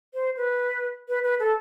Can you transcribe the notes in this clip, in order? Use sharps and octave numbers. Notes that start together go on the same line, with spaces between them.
C5
B4
B4
B4
A4